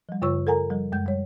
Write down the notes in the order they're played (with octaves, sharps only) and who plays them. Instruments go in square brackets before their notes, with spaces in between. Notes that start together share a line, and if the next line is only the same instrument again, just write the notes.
[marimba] F3 G3
F#2 C#3 F4 C#5 C#6 E6
A4 A#4 F#5 G#5 A#5
F3 G3
F#2 G#3 G6
G3 C#5